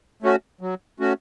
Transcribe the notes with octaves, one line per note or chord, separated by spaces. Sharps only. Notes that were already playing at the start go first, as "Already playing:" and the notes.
A3 C#4 F#4
F#3
A3 C#4 F#4